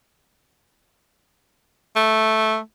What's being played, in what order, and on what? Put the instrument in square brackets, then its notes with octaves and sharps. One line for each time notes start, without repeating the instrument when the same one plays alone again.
[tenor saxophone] A3